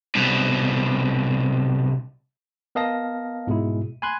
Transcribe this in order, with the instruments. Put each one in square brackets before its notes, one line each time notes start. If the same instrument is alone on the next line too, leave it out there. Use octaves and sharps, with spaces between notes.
[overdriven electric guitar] C2 B2
[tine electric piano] B3 A#4 D#5 F5 A5 A#6
G#2 B2 G#3 E4
G#5 B5 C6 F#6 G#6